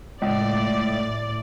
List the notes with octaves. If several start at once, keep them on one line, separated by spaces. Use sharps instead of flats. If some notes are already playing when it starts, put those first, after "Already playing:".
C#2 A2 D5